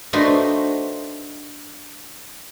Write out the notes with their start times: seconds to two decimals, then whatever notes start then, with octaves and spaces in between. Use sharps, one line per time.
0.13 A3 D4 D#4 F#4 B4 C5